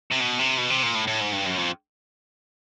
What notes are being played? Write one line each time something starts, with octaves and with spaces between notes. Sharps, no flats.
C3
B2
C3
B2
C3
A#2
A2
A2
G#2
G2
F#2
F2